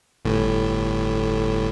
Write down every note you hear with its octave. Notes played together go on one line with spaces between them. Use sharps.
G1 A2